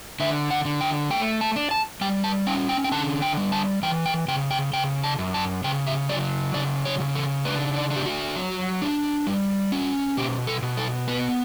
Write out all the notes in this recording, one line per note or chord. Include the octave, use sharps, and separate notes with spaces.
D3 E5
F#5
D3
G5
A3 G5
A5
D4
A5
G3 G5
A5
C#4 G5
G5
G5
D3 A5
G5
G3
A5
E3 G5
G5
C#3 G5
G5
C#3 G5
A5
F#2
A5
C#3 G5
E5
F#3 D5
C#3 D5
C#5
C#3
A4
D4 B4
D5
D4
G4
F#4
F#3
D4
G3
C#4
B2 G4
A4
B2
A4
B3 B4